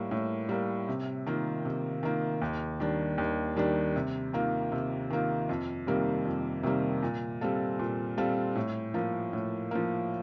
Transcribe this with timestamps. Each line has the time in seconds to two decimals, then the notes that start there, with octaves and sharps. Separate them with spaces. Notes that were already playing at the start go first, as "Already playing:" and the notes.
Already playing: A2 G3 A#3
0.11 A2
0.49 G3 A#3
0.88 C3
1.26 D#3 A#3 F4
1.65 C3
2.03 D#3 A#3 F4
2.42 D#2
2.80 D#3 G3 D4
3.18 D#2
3.56 D#3 G3 D4
3.96 C3
4.33 D#3 A#3 F4
4.72 C3
5.10 D#3 A#3 F4
5.49 F2
5.87 C3 D#3 G3 A#3
6.25 F2
6.63 C3 D#3 G3 A#3
7.03 A#2
7.41 G3 C4 F4 A4
7.79 A#2
8.17 G3 C4 F4 A4
8.55 A2
8.94 F3 A#3
9.33 A2
9.71 F3 A#3